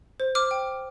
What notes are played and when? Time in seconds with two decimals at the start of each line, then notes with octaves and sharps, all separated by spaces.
0.20 C5
0.35 D6 F6
0.51 G5